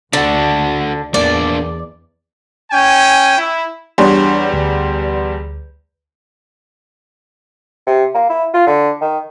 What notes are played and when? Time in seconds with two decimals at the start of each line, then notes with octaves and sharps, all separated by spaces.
0.13 D2 D3 D4 F#4
1.14 E2 A#3 D4 D5
2.71 C#4 G5 G#5
3.37 E4
3.98 E2 G3 D4 C#5 F#5 C6
4.53 D2
7.87 C3
8.14 A#3
8.30 E4
8.54 F4
8.67 D3
9.01 D#3